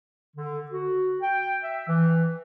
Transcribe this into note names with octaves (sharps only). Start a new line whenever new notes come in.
D3
F#4
G5
E5
E3